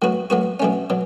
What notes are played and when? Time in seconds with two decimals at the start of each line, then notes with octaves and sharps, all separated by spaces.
0.02 A2 F#3 B3 F#4
0.30 A2 F#3 B3 F#4
0.60 B2 F#3 A3 C#4
0.90 B2 F#3